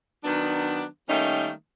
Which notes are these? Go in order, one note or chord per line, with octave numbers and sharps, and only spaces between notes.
D#3 F#3 B3 D4
D#3 G3 A3 A#3 C#4 D#4